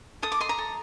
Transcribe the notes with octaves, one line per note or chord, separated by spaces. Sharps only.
A4 D#6
D6
D#5 C6
A#5
A4